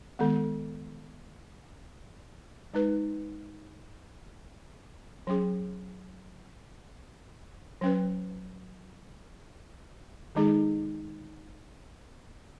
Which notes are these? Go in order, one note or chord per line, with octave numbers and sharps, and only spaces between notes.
D#3 G#3 B3
G#3 D#4 B4
F#3 C#4 G#4
F#3 C#4 B4
D#3 G#3 D#4 G#4